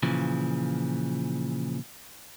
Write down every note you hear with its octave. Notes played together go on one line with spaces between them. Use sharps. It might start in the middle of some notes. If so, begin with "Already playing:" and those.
A#2 C#3 E3 F3